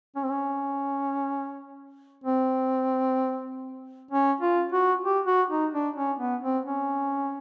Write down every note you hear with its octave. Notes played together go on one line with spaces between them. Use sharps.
C#4
C4
C#4
C4
C#4
F4
F#4
G4
F#4
D#4
D4
C#4
B3
C4
C#4